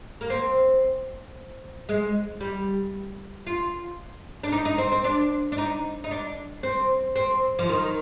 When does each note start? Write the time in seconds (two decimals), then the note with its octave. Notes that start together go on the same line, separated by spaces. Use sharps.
0.21 A#3
0.30 C4
1.89 G#3
2.41 G3
3.47 F4
4.43 D4
4.52 D#4
4.65 D#4
4.78 C4
4.92 C4
5.04 D4
5.52 D4
5.58 D#4
6.04 D#4
6.11 D4
6.63 C4
7.16 C4
7.59 F3
7.69 D#3